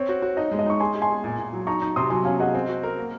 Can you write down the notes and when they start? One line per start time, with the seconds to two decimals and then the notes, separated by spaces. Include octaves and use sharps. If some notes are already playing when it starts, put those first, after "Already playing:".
Already playing: C4 C#5
0.09 F#4
0.22 F#4
0.37 D#4 D#5
0.52 G#3
0.59 D#5
0.66 D#4 C#6
0.80 G#4 G#5 C6
0.95 G#4
1.02 G#5 C6
1.10 G#4
1.24 A#2
1.38 A#2
1.53 F#3
1.67 D#4 A#5 C#6
1.82 D#4
1.96 C3 C6 D#6
2.10 F#3 G#5 C6
2.25 C#4 F5 G#5
2.40 G#4 D#5 F#5
2.55 C4 D#5
2.68 F#4
2.83 A#4
2.98 A#3